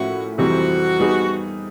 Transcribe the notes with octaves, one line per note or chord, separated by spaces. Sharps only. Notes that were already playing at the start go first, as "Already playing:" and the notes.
Already playing: A2 F3 A#3 C#4 E4 F#4
F2 C3 E3 G3 C4 F#4
G3 B3 D#4 G#4 B4